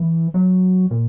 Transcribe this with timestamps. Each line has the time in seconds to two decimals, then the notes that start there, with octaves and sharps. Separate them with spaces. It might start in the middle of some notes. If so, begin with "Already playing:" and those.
Already playing: E3
0.34 F#3
0.91 A#2